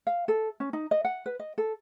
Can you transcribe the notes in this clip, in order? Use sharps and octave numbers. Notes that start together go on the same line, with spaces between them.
F5
A4
C#4
D#4
D#5
F#5
B4
D#5
A4